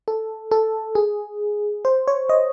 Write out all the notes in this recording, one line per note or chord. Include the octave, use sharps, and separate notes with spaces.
A4
A4
G#4
C5
C#5
D#5